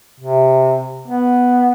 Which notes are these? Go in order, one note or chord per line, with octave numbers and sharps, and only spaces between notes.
C3
B3